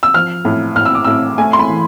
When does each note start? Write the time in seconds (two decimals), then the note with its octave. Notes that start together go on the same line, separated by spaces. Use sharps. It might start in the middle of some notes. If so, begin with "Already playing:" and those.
0.03 E6
0.14 F3 F6
0.45 A2
0.76 A2 F6
0.85 E6
0.95 D6
1.04 A2 E6
1.38 A3 G#5
1.53 C6
1.59 B5
1.69 E3